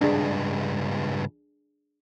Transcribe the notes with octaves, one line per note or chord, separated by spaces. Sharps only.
C#2 G2 D4 G#4